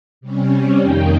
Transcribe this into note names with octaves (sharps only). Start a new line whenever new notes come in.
C3 G3 C#4
F2 D#3 A#3 D#4 G5